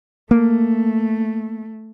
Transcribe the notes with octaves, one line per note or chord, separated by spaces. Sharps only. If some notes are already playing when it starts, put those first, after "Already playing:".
A3 A#3